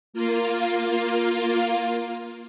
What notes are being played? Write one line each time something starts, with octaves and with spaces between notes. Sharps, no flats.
A#3 F4